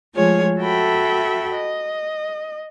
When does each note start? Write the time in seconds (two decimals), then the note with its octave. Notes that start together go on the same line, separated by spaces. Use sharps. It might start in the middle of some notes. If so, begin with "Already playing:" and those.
0.14 F3 G#3 A3 F4 G#4 C#5
0.59 F#4 A4 E5 G5 B5
1.54 D#5